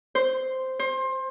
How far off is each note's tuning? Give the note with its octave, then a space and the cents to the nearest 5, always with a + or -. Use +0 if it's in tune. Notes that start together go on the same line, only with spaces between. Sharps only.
C5 -5
C5 +25